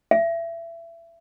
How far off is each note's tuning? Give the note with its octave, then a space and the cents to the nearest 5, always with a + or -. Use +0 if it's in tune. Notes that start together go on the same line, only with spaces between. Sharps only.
E5 +25